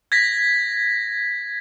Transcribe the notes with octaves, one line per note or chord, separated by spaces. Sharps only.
G#6 A#6 B6